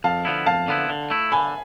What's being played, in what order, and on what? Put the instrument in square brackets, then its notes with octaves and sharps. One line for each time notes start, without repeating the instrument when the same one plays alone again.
[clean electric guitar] F2 [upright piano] F5 A5
[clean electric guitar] D3 F3 B3 E4
[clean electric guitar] F2 [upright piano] F5 A5
[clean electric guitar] D3 F3 B3 E4
D3
A3 E4
[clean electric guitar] D3 [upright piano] G#5 B5